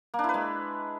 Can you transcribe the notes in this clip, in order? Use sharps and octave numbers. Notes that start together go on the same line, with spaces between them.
A#3
D4
E4
B4
G#3